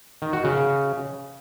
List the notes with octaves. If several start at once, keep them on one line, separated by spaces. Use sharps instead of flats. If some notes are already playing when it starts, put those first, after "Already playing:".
D#3
F#4
C#3